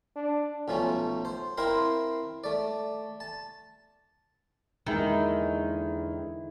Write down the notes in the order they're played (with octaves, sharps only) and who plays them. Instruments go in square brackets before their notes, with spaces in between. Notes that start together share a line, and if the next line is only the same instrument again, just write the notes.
[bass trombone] D4
[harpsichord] B1 F3 A3 C#4
C5
C4 E4 A#4 C5 F5 C6
A3 D5
A5
[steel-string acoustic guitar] E2 D#4 [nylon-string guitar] D3 G#3 A#3 [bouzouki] D#3 [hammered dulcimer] E4 G#5